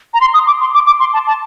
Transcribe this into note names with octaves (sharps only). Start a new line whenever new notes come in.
A#5
C6
D#6
D6
C6
D6
D6
C6
A5
A5